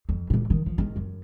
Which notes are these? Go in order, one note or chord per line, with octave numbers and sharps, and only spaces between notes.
F2
G#1 A#2
D#3
F3
G#1 D#3
F#2